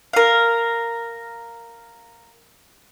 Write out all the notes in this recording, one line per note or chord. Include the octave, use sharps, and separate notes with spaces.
A#4 F5